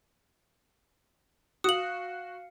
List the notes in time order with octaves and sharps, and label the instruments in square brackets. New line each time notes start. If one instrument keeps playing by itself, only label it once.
[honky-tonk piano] F#4 [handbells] F5 C#7 [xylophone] D#6 F#7